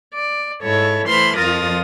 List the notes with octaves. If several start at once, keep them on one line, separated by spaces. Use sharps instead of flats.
D5
G#2 E4 A4 C#5
E3 A3 C5 B5 C6 F6
F2 F3 F4 A#4 D#6 A6